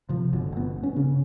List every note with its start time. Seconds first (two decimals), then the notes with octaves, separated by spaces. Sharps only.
0.09 C3 F3
0.33 G1 B2 D3
0.52 G1 B3
0.83 C#4
0.96 C#3